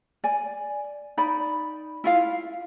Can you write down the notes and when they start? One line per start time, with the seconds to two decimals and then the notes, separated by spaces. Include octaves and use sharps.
0.24 D5 G#5
1.17 D#4 D5 B5
2.04 E4 F4 F5